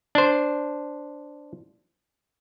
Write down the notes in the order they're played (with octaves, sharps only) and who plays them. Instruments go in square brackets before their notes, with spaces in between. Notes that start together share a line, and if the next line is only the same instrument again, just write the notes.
[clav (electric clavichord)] D4 C5